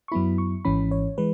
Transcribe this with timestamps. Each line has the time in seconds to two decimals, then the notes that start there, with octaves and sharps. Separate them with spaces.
0.08 C#6
0.12 F#2 F#3 B3 E4 B5
0.38 C#6
0.65 G#1 G#2 E3 C#4 B5
0.91 C#5
1.18 E3 G#3 B4